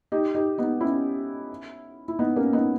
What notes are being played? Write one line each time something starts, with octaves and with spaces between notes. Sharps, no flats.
D#4 G4
D#4 G4
B3 D#4
C#4 E4
E4
B3 D#4
A#3 C#4
B3 D#4